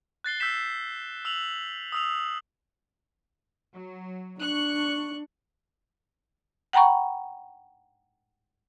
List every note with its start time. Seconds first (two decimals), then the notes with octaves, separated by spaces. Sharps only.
0.24 F#6 A6 C7 G7
0.40 E6 G6 A6 B6 E7
1.25 E6 F7 F#7
1.92 D#6 E6 F7
3.74 F#3
4.41 D4 C#6 F#6
6.73 F#5 G5 A#5 B5 C#6